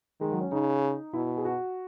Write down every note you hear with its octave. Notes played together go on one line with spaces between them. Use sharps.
D#3 G#3
F#3
C#4
C#3 D#4
B2 E4
G#4
F#4